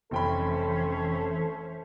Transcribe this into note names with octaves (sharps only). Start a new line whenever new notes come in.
F1 E3 C#4 A4 C5 E5 G5 B5